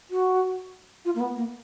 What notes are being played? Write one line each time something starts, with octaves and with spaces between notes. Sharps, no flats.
F#4
F4
A#3
B3
A#3